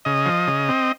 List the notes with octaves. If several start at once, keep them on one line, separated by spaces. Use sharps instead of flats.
C#3 D#5
F3
C#3
C4